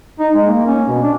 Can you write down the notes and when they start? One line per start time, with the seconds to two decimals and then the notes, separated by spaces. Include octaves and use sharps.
0.19 D#4
0.34 G#3
0.47 A#3
0.66 C#4
0.88 B2
1.02 D4